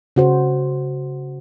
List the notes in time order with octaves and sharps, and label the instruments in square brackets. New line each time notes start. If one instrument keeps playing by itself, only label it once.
[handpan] C#3 F#4 C5